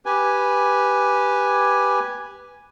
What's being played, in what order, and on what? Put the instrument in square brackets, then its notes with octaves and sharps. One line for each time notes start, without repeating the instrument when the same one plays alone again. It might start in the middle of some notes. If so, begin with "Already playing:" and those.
[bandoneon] G4 B4 G#5